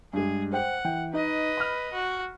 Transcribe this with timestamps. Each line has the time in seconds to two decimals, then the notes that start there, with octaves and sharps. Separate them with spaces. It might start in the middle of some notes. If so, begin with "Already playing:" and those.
0.13 G2 G#3 G#4
0.53 C5 F#5 G5
0.85 E3 G5
1.14 D#4 B4 D#5
1.57 B5 F6
1.93 F#4